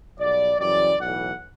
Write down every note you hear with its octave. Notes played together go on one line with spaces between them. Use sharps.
B1 B2 G3 D5
F#2 C#3 E3 G3 D5
B1 A2 E3 F#5